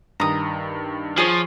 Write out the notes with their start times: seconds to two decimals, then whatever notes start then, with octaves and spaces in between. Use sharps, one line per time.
0.20 G2 D#3 A#5 D#6
1.18 F3 G#4 C#5